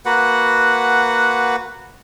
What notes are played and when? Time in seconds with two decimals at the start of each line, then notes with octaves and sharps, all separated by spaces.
0.05 A#3 F#4 B4 F#5